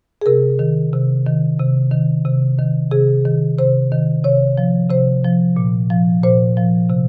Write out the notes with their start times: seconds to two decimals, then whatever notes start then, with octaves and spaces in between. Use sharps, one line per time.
0.21 G#4
0.26 C3 A#4
0.59 D#3
0.93 C3
1.26 D#3
1.59 C3
1.91 D#3
2.25 C3
2.58 D#3
2.91 C3 G#4
3.25 D#3
3.58 C3 C5
3.92 D#3
4.24 C3 C#5
4.58 F3
4.90 C3 C5
5.24 F3
5.56 A#2
5.90 F3
6.23 A#2 C5
6.57 F3
6.90 C3